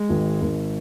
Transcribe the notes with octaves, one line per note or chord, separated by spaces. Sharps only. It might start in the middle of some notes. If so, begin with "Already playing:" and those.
Already playing: G#3
G#1
G#1